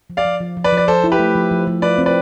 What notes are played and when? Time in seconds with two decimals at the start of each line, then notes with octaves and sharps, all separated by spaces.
0.10 F3
0.17 D5 F5
0.25 F3
0.40 F3
0.57 F3
0.64 B4 D5
0.72 F3
0.77 D5
0.88 F3 A4 C5
1.04 E4
1.12 G4 B4
1.19 A3
1.35 F3
1.51 F3
1.67 F3
1.82 F4 B4 D5
1.98 C4
2.06 B4 D5